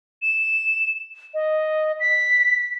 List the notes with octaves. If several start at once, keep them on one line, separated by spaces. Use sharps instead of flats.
E7
D#5
B6